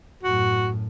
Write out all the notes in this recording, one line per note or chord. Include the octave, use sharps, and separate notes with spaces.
F#2 A2 F#4